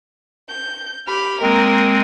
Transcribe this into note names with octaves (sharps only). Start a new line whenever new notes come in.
G6
G4 B5 F6
G#3 A#3 C4 A#4